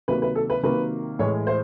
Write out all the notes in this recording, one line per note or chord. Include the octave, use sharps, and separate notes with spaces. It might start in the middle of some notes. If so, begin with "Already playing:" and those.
C3 D#3 F#3 A#3 B4
B4
A4
B4
C3 D#3 F#3 A#3 B4
A2 E3 G#3 C#5
C5